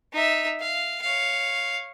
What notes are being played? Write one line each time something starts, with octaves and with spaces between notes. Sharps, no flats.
D#4 E5
F5
C#5 F5